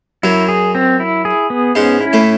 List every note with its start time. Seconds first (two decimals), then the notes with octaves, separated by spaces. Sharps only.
0.23 F#2 F#3 E4
0.49 G#4
0.75 C4
1.00 E4
1.25 G#4
1.50 B3
1.75 G#2 G#3 C#4
2.00 E4
2.13 A2 A3